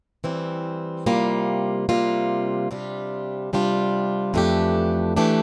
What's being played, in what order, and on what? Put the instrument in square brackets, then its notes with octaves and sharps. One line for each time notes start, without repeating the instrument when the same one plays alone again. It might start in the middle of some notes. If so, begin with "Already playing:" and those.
[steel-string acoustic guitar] E3 G3 C4
C3 G3 A#3 F4
C3 G3 A#3 F4
C3 G3 D4 F4
C3 G3 D4 F4
F2 E3 A3 D4 G4
E3 A3 D4 G4